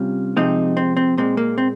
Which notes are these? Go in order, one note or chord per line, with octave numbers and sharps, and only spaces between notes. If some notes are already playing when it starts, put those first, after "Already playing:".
Already playing: C3 G3 C#4 F4
C3 F3 G#3 C4 D#4
C4
C4
A#2 G#3 C4
A#3
C4